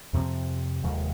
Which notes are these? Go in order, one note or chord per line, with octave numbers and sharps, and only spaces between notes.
F2 C3 F3 C4
F1 D#2 D#3 G#3